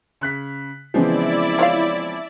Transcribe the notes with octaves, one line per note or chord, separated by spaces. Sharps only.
C#3 F#6 B6
C#3 E3 F3 G#3 B3 C4 E4 D5
F4 C#5 F5